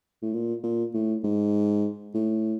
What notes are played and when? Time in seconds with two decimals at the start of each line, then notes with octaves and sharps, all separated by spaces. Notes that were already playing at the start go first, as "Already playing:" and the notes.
0.22 A2
0.33 A#2
0.63 A#2
0.94 A2
1.24 G#2
2.14 A2